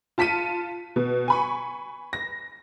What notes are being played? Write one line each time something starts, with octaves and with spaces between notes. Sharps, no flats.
F4 A5 B6 C#7 D#7
B2
G#5 B5 C#6
A#6